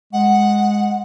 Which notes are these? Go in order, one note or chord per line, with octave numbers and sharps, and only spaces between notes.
G#3 F#5